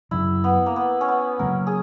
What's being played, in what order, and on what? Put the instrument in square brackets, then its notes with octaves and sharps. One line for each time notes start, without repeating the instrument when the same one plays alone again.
[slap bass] F#2 C#3 F#3 [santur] E4
[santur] B3
A#3
B3
C#4
B3
[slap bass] C#3 F#3 A#3 [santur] A#4
[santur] G#4